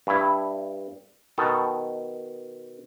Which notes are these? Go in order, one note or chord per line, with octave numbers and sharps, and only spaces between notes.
G2 E4
B2 D#3 A4